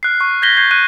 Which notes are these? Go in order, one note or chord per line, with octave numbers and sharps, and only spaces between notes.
F6 F#6 C7
C#6
G6 G#6 A#6 B6 G7
G6 G#6 C7
F#6 D#7 G7